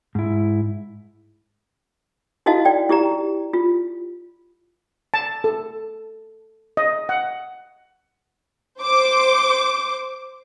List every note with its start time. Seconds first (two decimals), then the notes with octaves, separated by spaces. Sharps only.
0.15 G#2 E4
2.46 D#4 E4 F#4 D#5 F5 A5
2.65 D5 G5
2.89 E4 G4 D5 A#5
3.53 F4
5.14 A5
5.44 A4
6.77 D#5
7.09 F#5
8.80 C5 D6